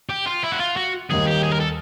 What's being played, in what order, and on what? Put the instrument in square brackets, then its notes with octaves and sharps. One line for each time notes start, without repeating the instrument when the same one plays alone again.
[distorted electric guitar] G4
F4
E4
F#4
F4
F#4
[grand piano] D#2 D#3 G3 [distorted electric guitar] G#4
[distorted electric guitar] G4
G#4
A#4
A4